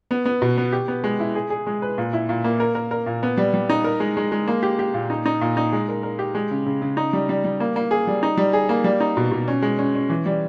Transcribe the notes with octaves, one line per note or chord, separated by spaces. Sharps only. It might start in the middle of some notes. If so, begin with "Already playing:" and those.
B3
B3
B2
B3
G4
B3
G#3
E4
G#4
G#4
G#3
B4
A#2
E4
A#2
A#3
A#4
A#4
A#4
A#2
B3
G3
G3
D#4
A#4
G#3
G#3
G#3
A#3
G4
G4
A#2
D#4
D#4
A#2
D#4
G#3
A#4
A#4
G4
G#3
C#3
C#3
C#3
D#4
G3
G3
G3
A#3
A#3
G#4
G3
D#4
G3
G#4
A#3
G3
D#4
B2
B2
C#4
G#3
C#4
C#4
E3
G3